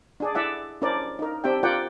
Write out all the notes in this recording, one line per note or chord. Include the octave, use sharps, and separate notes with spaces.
D4 G#4 D5
E4 D5 E5 F#5
C#4 D4 E4 A#4 C5 D5
D#4 A#4
C4 D4 G4 E5 G5
F4 A#4 D5 F#5 G5